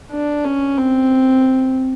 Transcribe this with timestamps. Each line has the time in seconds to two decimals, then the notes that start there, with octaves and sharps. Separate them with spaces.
0.11 D4
0.45 C#4
0.78 C4